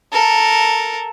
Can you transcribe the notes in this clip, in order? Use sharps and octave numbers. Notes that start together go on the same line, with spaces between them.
A4 A#4